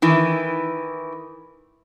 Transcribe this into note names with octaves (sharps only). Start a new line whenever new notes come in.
D#3 E3